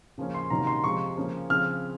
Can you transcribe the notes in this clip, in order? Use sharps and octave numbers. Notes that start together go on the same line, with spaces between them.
C#3 F3 A#3 C#4
C6
C3 D#3 F#3 A#3 C#4 A#5
C6
C3 F3 G#3 C#6
C#3 F3 A#3 C#4
C#3 F3 C4 F6